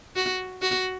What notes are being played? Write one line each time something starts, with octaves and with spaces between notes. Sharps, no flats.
F#4
F#4